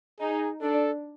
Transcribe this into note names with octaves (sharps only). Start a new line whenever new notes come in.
D#4 G#4
D4 A4